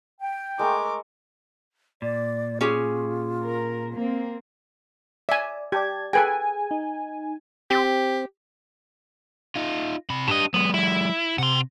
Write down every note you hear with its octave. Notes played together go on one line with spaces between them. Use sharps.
G5
G#3 A3 A#4 C#6 D6
A#2 D5
C#4 F4 G4 G#4
A#4
A#3 C4
D5 E5 G#5
G4 D5 A5 G#6
G#4 A4 B4 G5 G#5
D#4
C4 G4
D#4 F4
C3 B5
A2 D4 G4 D#5
F#3 G#3 B3
E4
C3 F#5 C6